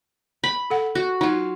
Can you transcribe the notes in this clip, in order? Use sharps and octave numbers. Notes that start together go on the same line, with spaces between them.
B5
A4 F#5
F#4
F#3 D#4 F4